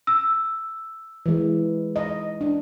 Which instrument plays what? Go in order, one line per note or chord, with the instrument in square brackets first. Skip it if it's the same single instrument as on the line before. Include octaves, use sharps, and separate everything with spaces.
[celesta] E6
[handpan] E3 G#3
D#5
D4